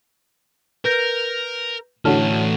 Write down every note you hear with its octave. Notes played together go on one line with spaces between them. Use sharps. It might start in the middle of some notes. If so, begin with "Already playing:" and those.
A#4 B4 G6 A#6
A2 D3 E3 F#4 C#5 A5 F6